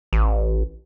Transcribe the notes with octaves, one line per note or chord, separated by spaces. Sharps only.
A1